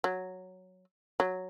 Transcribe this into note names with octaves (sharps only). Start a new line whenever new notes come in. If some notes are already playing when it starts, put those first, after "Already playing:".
F#3
F#3